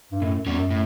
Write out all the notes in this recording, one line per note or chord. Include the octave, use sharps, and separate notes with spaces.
G2
F#2 A2
E2 G3 C#4
F#2
A2